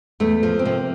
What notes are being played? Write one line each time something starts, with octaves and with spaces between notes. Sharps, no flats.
E2 A3
F3
C4
C3 A#3